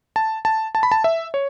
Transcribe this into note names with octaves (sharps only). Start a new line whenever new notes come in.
A5
A5
A5
B5
A5
E5
C#5